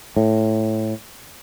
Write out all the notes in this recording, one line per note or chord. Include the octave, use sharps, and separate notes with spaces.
A2